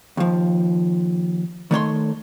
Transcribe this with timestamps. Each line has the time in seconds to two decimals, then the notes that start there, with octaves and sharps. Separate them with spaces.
0.17 D#2 F3
1.71 D#3 A3 C#5 C6